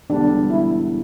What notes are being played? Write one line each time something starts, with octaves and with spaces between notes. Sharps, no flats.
E1 E2 D3 G3 D4
E4